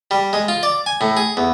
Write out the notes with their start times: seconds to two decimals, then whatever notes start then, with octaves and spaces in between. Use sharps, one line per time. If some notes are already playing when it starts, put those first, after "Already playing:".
0.11 G3
0.33 G#3
0.48 F4
0.63 D5
0.86 G#5
1.01 A2
1.17 G#4
1.37 E2